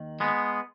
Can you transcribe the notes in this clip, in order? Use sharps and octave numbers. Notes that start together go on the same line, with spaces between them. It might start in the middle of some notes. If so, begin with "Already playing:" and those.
Already playing: D#2 D#3
G#3 B3